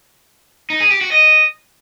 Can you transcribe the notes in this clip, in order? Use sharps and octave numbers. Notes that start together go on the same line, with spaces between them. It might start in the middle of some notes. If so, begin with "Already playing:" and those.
D#4
G#4
G4
F#4
D#5